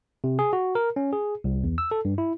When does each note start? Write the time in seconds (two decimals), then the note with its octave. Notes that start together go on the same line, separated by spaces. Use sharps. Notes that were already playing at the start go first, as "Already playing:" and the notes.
0.24 C3
0.39 G#4
0.53 F#4
0.75 A#4
0.96 C#4
1.12 G#4
1.44 C2
1.64 E2
1.78 E6
1.91 A4
2.05 G2
2.18 E4